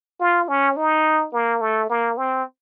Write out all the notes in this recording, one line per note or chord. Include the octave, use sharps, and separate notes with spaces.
F4
C#4
D#4
A#3
A3
A#3
C4